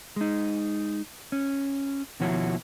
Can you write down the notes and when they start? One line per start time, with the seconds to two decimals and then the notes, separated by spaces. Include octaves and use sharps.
0.16 G#3 D#4
1.32 C#4
2.20 D#2 B2 F3 E4 F#4 C#5